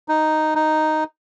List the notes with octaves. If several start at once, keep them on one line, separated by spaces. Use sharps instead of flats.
D#4
D#4